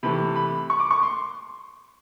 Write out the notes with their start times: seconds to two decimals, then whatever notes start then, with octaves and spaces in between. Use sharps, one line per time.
0.03 C3 E3 A3 B5
0.36 B5
0.70 C#6
0.80 D6
0.91 C#6
1.03 C6